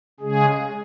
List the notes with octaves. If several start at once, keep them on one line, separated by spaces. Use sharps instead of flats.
C#3 G#3 G#4